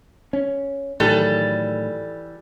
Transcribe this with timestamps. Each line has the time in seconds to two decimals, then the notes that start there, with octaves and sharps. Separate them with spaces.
0.33 C#4
1.00 A2 D#3 E3 F#3 G3 A4